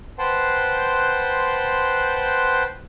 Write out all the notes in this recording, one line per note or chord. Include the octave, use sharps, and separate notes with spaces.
B4 C5 F#5 G5 A5 C6